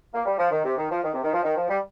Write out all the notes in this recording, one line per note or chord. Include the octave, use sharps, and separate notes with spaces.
A#3
G3
F3
D#3
C3
D#3
F3
D#3
C3
D#3
F3
D#3
F3
G3